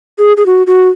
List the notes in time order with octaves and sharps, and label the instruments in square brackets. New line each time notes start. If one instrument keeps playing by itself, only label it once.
[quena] G#4
G#4
F#4
F#4